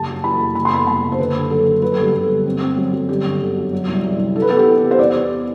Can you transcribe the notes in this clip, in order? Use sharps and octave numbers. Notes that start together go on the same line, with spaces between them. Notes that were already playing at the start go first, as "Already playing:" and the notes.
Already playing: F#1 G3 A5
F#2
E3 B5
F#1
F#1 B5
C6
E2 B5
F#1 A5
F#1
C5
D3 B4
D3
F#3 A4
D3
F#3 B4
A4
G1 G4
G1 A4
G1
C4
C4
F#3
F#3
G1 G4
D3
D3
F#2
F#3
C2
C2
C2
E3 A4
B4
B3 A4
G4
E3
C3
C5
E2 D5
E2